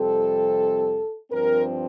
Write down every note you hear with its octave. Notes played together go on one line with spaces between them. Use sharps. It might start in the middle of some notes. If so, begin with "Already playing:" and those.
Already playing: F2 C3 G3 C4 A4
G2 F3 C4 A#4